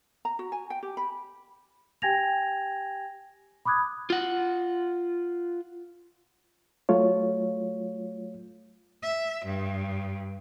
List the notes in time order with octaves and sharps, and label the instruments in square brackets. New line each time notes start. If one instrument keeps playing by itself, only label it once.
[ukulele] A#5
F#4
G#5
G5
G4
B5
[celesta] G4 G5 G#5 G#6 A#6 F7
B5 D6 D#6 F#6 G#6
[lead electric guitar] F4 F#5
[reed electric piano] F#3 A3 F4 C#5
[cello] E5
G2